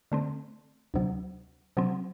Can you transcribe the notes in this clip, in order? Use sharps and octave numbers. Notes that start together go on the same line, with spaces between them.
D3 A3 C4
D2 C3 F#3
C3 F#3 C4